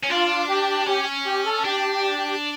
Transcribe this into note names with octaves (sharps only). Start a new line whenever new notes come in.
C#4
D4 F4
G4
C#4 G4
G4
A4
D4 G4